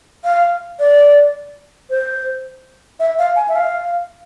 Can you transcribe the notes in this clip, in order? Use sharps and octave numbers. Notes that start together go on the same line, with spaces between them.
F5
D5
C5
E5
F5
G#5
E5
F5